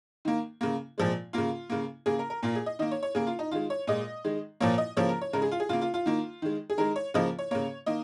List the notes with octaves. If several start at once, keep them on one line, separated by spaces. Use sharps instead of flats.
D#3 A#3
C#3 A#3
A#2 F3 G#3
C#3 A#3 F4
C#3 A#3
C#3 A#3 G#4
A#4
A#4
A#2 A#3 F4
G#4
D#5
D#3 A#3 D#5
C#5
C#5
C#3 A#3 G#4
F4
D#4
D#3 G#3 F4
C#5
A#2 G#3 D#5
D#3 G#3
A#2 F3 A#3 C#5
D#5
C#3 F3 A#3 C#5
A#4
C#5
C#3 G#3 A#4
G#4
F4
G#4
C#3 A#3 F4
F4
F4
D#3 A#3
D#3 G#3
G#4
D#3 G#3 A#4
C#5
C#3 F3 A#3 D#5
C#5
C#3 A#3 C#5
D#3 A#3 D#5